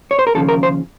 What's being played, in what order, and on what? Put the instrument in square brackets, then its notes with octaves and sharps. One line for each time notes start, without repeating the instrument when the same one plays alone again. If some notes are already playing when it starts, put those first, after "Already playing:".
[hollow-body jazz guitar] C#5
C5
A#4
D#2 C#3 F3 A4
A#4
C5